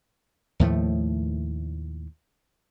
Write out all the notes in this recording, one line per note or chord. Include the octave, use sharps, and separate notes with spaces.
D#2 A2 F3 A3